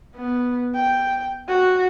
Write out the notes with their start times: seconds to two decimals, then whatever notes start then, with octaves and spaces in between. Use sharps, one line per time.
0.16 B3
0.75 G5
1.48 F#4